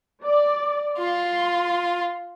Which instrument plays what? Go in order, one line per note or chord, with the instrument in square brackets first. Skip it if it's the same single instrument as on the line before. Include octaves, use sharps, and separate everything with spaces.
[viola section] D5
[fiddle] F4 [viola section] C6